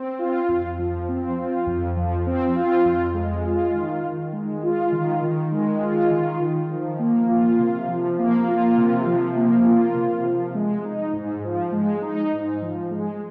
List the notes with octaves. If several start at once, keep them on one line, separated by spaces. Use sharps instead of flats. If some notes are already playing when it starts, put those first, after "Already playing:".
Already playing: C4
F4
F2
F3
C4
F4
F2
F3
C4
F4
F2
G#3
F4
D#3
D#3
G#3
F4
D#3
D#3
G#3
F4
D#3
D#3
F3
A#3
F4
C3
F3
A#3
F4
C3
F3
A#3
F4
C3
F3
G#3
D#4
G#2
F3
G#3
D#4
G#2
F3
G#3